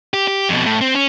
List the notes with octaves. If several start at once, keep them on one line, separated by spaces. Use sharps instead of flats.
G4
G4
F2 B2
A2
C4
C#4